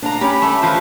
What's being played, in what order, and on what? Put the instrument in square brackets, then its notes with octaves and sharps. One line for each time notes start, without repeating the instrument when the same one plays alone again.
[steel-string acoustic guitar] D4 F5 A#5
[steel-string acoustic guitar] C#4 G4 [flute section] B5
[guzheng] A3 [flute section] B5
[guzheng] F3 B4 C5 [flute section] F4